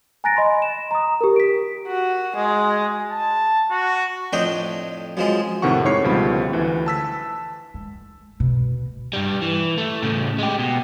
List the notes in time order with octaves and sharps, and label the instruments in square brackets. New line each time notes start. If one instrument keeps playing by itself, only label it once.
[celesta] G#5 A#5 F#6 A6 A#6 D7
D#5 G#5 B5 C6
E7
A#5 D#6
G4 A#4
B6 D7
[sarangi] F#4
G#3
[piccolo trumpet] A5
F#4
[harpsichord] F2 A2 D4 D#4 G5
F#2 F3 G#3
[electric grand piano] F2 A2 C3 D#3 F#5 C#6
G#2 E4 C#5 C#6 C7
C#2 B2 D3 F3 G3 B5
D2 E3
A5 E6 B6
[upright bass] G#3
B2
[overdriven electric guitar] G2 G3
E3
A3
A2 C#3
G#3 G4
B2